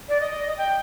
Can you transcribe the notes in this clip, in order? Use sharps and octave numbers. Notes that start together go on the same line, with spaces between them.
D5
D#5
G5